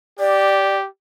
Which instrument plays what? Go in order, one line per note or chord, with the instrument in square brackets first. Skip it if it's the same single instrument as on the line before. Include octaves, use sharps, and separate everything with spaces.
[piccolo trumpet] G4 [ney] D5